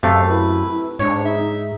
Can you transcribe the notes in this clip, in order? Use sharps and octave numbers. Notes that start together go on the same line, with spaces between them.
F#2 C3 A3 F5
E4 B4
G#2 D4 C#5
D#4 E5